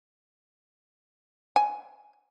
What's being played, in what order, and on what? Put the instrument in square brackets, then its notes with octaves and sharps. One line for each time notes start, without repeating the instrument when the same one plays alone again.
[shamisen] G#5